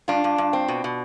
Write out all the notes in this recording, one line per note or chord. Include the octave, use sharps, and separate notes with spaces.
G2 D4 F4
G2
G2
C4
B2
B2